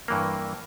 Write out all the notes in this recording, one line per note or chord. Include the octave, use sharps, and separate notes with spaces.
G2 E3 A#3